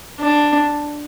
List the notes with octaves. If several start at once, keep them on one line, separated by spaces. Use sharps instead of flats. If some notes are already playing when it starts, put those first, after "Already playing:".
D4